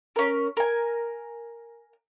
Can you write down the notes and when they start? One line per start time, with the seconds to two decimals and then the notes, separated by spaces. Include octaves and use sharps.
0.16 C#4 A#4
0.57 A#4 G#5